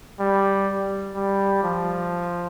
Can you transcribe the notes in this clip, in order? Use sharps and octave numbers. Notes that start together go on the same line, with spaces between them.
G3
G3
F3